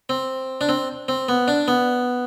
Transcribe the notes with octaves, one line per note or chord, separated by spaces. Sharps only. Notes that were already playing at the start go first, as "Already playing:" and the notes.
C4
D4
C4
C4
B3
D4
B3